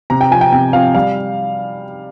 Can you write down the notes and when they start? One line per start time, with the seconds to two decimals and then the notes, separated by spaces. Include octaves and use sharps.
0.10 C3 A#5
0.21 G5
0.31 F3 G#5
0.35 C4
0.41 G5
0.52 C3 G5
0.73 F3 C4 F5
0.95 G3 F5